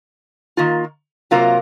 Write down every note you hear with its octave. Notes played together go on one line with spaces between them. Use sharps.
D#3 A#3 F4
C3 F#3 A#3 F4 A#4